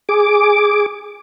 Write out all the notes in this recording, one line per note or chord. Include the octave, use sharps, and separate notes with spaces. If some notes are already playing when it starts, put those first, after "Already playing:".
G#4 D6